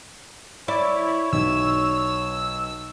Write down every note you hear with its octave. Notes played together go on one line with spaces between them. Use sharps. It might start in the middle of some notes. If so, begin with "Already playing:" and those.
E4 C#5 D5
B1 E6